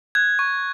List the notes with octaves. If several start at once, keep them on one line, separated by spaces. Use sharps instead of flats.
F#6 G#6
C#6